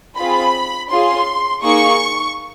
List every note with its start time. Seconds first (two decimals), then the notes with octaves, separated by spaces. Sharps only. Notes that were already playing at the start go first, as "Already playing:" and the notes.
0.17 C4 F4 G#4 B5
0.89 C#4 F4 G#4 C6
1.62 A#3 D#4 G#4 C#6